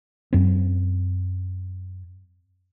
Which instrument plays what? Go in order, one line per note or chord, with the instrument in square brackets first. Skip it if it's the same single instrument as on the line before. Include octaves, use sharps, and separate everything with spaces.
[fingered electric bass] F#2 C4